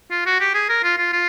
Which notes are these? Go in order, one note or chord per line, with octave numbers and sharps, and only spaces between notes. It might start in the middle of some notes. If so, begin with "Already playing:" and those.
F4
F#4
G4
G#4
A#4
F4
F4
F4